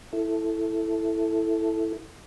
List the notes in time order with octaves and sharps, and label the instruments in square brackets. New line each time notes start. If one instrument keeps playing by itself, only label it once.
[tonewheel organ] E4 A4